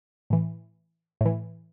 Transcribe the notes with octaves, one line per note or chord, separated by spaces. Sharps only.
A2 E3
A2 E3